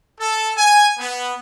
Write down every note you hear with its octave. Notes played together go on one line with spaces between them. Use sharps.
A4
G#5
B3